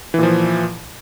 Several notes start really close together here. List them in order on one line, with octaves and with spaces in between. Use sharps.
E3 A#2 F3